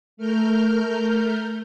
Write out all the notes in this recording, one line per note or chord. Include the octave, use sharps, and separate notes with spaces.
A3 A#4 F6 G6